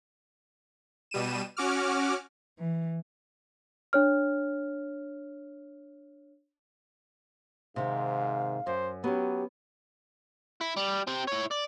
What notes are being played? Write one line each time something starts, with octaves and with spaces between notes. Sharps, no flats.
B2 G3 D#7 E7
C#4 F#4 D6 F6
E3
D4 C#5 F6
G#2 C3 D#3 F5
F#2 C5
F#3 B3 C#4 G4
E4
G3
C4 G4
E4 C#5
D5